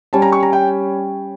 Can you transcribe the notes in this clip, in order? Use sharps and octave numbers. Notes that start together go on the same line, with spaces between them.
G3 C#4 G4 A5
A#5
C#6
A#5
G5